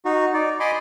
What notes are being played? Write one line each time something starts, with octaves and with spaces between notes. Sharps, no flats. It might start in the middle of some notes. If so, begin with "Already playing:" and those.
D#4 F#4
D#4 D5
D#5 G#5 B5 C6 D6